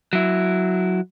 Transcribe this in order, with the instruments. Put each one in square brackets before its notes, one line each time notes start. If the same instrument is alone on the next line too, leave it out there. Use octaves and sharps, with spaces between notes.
[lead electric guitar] F#3 E4